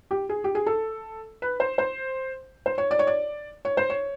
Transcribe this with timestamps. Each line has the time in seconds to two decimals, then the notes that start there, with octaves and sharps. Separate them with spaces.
0.11 G4
0.29 G#4
0.44 G4
0.55 G#4
0.66 A4
1.42 B4
1.60 C5
1.78 C5
2.66 C5
2.78 C#5
2.91 D5
2.99 C#5
3.07 D5
3.65 C#5
3.77 C5
3.90 C#5